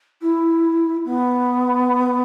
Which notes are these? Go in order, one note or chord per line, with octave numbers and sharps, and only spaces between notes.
E4
B3